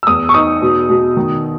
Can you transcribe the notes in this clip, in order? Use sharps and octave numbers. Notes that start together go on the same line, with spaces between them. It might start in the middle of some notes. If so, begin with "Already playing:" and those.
E6
E2 D#6
C#6
D#4 D#6
B2
B2
D#3